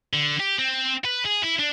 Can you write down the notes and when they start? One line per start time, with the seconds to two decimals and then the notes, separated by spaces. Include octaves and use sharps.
0.13 D3
0.40 G4
0.59 C4
1.05 B4
1.26 G#4
1.44 E4
1.59 D4